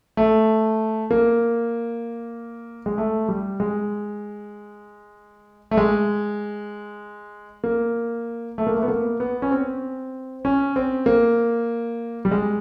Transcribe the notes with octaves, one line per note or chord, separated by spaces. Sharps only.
A3
A#3
G#3
A3
G3
G#3
A3
G#3
A#3
A3
A#3
A3
B3
A#3
B3
C#4
C4
C#4
C4
A#3
G3
G#3